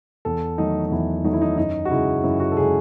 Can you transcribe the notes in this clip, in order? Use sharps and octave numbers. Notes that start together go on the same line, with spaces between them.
E2 A4
D#3 F#3 A3 D#4
D#4
E2 E4
D#3 F#3 A3 D#4
E4
D#4
F#2 D#4
F#4
C#3 G#3 E4
F#2 E4
F#4
A4
C#3 G#3 G#4